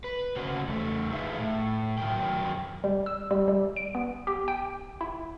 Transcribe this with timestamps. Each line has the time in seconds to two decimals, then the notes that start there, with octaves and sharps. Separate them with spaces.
0.04 B4
0.36 C#3 A#3 C#4 F#4 C5
0.67 E2 A3
1.11 D#4 E4 G#4 B4 E5 F5
1.38 A2
1.98 F#2 D#3 F#3 G#3 A#4 G5
2.84 G3
3.06 E6
3.31 G3
3.48 G3
3.76 D7
3.95 B3
4.27 G4
4.48 G5
5.01 E4